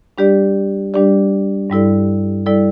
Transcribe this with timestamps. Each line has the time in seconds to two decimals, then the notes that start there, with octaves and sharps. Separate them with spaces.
0.18 G3 D4 G4 D5
0.94 G3 D4 G4 D5
1.70 G2 G3 E4 A4 D5
2.46 G3 E4 A4 D5